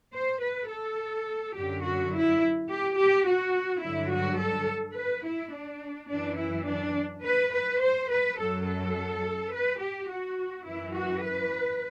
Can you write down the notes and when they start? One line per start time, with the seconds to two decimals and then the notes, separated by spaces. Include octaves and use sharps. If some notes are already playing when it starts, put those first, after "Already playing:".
0.13 C5
0.41 B4
0.70 A4
1.55 F#2 D3 F#3 G4
1.83 F#4
2.12 E4
2.69 G4
2.98 G4
3.26 F#4
3.82 G2 D3 F#3 E4
4.11 F#4
4.39 A4
4.96 B4
5.24 E4
5.54 D4
6.10 F#2 E3 D4
6.39 E4
6.67 D4
7.24 B4
7.53 B4
7.81 C5
8.10 B4
8.37 F#2 F#3 A4
8.66 A4
9.52 B4
9.80 G4
10.08 F#4
10.65 F#2 E3 E4
10.93 F#4
11.22 B4